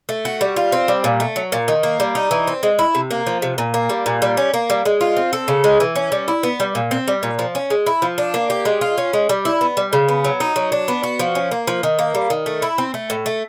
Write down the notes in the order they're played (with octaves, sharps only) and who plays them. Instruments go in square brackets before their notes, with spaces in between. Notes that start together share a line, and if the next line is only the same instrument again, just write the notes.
[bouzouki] A3
F#4
G3
F4
C4
G3
A#2
A3
F#3
A#2
D#3
A#3
G3
D#4
E3
C4
G#3
E4
C3
A#3
F3
C3
A#2
A#3
G3
A#2
G3
C#4
A#3
G3
G#3
F4
C4
A4
C#3
G#3
E3
C#4
G3
E4
B3
G3
A#2
C4
G3
A#2
F3
C#4
G#3
E4
F3
D4
A#3
G4
G#3
F4
C#4
G#3
G3
E4
B3
G3
C#3
B3
F#3
D#4
F#3
D4
B3
F#4
F3
C#4
A#3
F3
D#3
A#3
G3
D#3
A3
E4
C4
A3
A2
A3